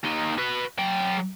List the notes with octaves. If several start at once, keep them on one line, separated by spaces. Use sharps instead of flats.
D#2 D#4
F#4 B4
F#3 G5